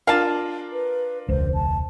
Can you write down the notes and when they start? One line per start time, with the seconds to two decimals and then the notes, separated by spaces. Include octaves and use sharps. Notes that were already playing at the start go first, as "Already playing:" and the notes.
0.07 D4 F4 A#4 F5 A5
0.73 B4
1.28 E1 C#2 C5
1.54 A5